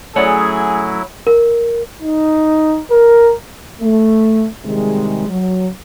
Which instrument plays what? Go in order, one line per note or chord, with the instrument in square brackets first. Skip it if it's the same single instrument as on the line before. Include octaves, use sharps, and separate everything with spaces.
[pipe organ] F#3 E4 [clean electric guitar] A3 C#4 F#5 [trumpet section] G#4 [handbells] C#5 D5
[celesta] A#4
[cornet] D#4
A#4
[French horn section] A3
C3 D#3 G3 G#3
F#3